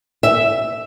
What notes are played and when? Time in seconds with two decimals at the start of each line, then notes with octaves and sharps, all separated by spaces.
0.23 E5